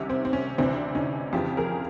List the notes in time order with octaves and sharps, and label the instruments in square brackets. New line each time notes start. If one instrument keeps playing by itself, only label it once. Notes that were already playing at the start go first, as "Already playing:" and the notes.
Already playing: [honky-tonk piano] C2 C3 D#3 C#4
C4
C4
C#4
D2 C3 E3 C4 D4
C#4 D#4
F2 C#3 E3 F4 G4
G#4 A#4